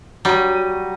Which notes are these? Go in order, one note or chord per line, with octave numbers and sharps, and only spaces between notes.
F#3 G3 D#6